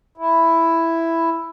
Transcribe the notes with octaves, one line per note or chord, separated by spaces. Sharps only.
E4